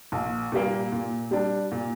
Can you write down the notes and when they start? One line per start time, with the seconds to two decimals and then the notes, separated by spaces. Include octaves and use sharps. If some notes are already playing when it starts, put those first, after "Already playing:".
0.12 A#1
0.52 A#2 G3 A#3
0.92 A#2
1.31 G3 D4
1.71 A#2